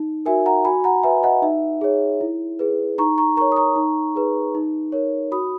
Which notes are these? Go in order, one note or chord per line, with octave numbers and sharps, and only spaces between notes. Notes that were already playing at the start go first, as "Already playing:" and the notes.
Already playing: D#4
F#4 A#4 E5 G#5
F#5 A#5
F#4 G#5 B5
F#5 A#5
B4 E5 G#5
D#5 F#5
D#4 E5
G#4 C#5
E4
G#4 B4
D#4 A#5 C#6
A#5 C#6
A#4 C#5 A#5 C#6
D#6
A#5 C#6
D#4
G#4 B4
D#4
A#4 C#5
F#4 B5 D#6